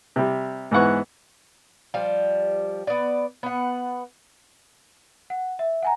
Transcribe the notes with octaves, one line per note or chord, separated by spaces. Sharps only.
C3 G3
G#2 E3 B3 F#5 C#6
F3 G3
B3 D5
B3 F#5
F#5
E5
F#5 G#5 A#5